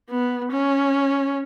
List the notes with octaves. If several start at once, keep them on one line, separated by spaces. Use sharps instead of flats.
B3
C#4